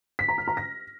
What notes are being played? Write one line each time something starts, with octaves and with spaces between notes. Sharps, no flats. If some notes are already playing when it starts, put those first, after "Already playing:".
B6
A#5
F6
A#5
A#6